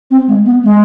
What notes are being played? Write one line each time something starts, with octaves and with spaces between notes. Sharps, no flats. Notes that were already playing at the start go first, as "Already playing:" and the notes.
C4
G#3
B3
G#3